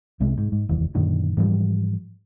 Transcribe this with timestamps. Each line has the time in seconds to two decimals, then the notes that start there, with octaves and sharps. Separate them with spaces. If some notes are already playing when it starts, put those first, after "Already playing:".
0.20 C2 C3 G#3
0.38 G#2
0.52 G#2
0.69 F1 D#2 E3
0.95 F#2 A#2 D3 D#3
1.37 G#2 E3 F3 G3